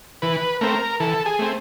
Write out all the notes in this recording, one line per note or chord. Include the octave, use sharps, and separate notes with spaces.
E3 B4
A3 C4 A#4
E3 A4
G#4
A3 C4